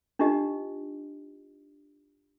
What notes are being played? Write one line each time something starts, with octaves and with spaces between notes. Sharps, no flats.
D4 D#4 F4 G4 D#5